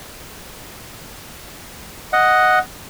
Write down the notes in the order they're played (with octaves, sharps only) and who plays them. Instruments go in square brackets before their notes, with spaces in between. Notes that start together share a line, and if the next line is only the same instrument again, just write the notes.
[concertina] D#5 F#5